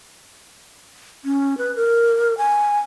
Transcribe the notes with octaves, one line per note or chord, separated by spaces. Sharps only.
C#4
B4
A#4
G#5